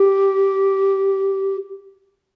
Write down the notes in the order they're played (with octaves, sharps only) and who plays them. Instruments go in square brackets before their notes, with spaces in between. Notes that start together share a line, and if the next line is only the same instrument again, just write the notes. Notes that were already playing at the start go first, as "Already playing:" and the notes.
Already playing: [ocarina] G4